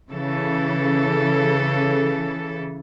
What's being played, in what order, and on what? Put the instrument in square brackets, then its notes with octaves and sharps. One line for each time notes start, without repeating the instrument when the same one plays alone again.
[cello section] C#3 E3 A4